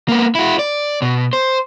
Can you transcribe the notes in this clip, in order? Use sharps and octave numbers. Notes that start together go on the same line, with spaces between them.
A#3 B3
E4 F#4
D5
B2
C5